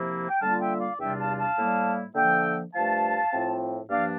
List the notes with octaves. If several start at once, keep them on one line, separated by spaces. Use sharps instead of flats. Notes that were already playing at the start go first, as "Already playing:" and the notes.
Already playing: C3 F3 A#3 E4
G5
D3 G3 A#3 F4 F5 A5
E5 G5
D5 F5
E2 C3 G3 D4 F4 E5 G5
F5 A5
F5 A5
A2 G3 A#3 E4
D3 F3 A#3 E5 G5
G2 F3 A3 F5 A5
A2 F3 C4 F4
G2 F3 A#3 D4 D5 F5